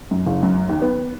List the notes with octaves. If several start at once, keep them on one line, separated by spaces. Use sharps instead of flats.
F#2
F#1
F#2
D#2
B3